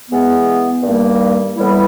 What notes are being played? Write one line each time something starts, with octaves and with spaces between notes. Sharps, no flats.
E3 G#3 B3
G2 D#3 G3 A#3
A2 E3 G3 B3 E4